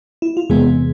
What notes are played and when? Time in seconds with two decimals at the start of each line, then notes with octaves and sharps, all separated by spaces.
0.22 E4
0.37 F4
0.50 E2 C3 E3 G#3 B3 G#4